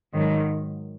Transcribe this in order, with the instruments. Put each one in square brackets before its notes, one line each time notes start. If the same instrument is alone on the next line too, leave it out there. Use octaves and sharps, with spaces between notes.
[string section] G#2 D#3 F#3